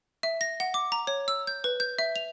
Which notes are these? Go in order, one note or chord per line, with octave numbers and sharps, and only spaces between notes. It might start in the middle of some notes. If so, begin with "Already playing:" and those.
E5
A#6
F#5
D6
A#5
C#5
E6
G6
B4
G6
E5
F7